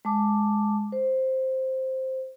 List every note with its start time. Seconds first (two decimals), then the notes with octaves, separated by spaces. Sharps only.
0.05 G#3 A5 D6
0.92 C5